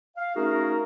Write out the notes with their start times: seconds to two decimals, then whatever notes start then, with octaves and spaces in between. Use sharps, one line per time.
0.16 F5
0.36 A3 C#4 D#4 F#4 G#4 A#4